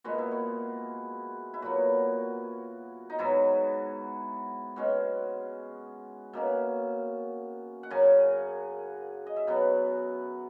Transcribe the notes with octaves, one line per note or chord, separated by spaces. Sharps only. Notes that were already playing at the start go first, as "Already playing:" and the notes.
A#2 G#3 B3 F#4
E4
F#4
E4
A#2 F#3 B3 F#4
D#4
G#2 F#3 B3 E4
B2 G#3 C#4 F#4
B2 A#3 C#4 E5
F#5
F#2 C#3 F#3 G#5
D#5
E5
B2 F#3 B3 F#5